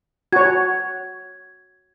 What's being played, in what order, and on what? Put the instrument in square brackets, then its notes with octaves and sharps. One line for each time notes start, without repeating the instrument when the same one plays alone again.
[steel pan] F#4 C#5 [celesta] G#6